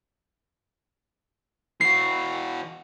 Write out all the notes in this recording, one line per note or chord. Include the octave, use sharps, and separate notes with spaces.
E3 F#4 C7